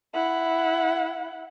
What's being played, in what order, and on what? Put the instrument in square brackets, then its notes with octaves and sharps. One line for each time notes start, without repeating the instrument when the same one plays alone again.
[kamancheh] E4 F#5